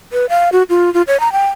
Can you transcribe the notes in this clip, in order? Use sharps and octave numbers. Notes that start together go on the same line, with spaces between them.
B4
F5
F#4
F4
F4
C#5
A#5
G5